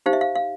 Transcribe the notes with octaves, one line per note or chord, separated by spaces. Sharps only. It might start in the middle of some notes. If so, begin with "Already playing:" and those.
D#4 G4 C5 F5
E5
F5
F5